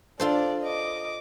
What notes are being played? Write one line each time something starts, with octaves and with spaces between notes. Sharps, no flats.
D4 F4 A4 C5 D5
D#5 D6